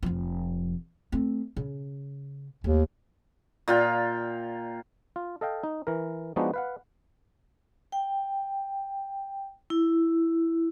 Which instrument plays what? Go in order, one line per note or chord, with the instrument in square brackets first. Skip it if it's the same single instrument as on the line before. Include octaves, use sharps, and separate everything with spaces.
[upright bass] F1 F3
A3 C4
C#3
[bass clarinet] D#2 [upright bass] A3
[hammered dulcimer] A#2 F4 G5
[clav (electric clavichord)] F4
A4 D#5 F5 G5
D#4
E3 A#4
F3 G#3 B3 D4 D#4 F#4
B4 F5 F#5
[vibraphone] G5
E4